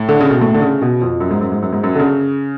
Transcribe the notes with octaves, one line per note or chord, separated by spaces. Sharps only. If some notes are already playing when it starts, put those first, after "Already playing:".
Already playing: A2
D3
C#3
B2
A2
D3
C#3
B2
F2
F#2
G#2
F#2
G#2
F#2
G#2
F#2
D3
C#3